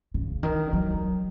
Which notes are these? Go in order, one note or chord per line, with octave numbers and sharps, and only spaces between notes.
C#3
D#3
F#3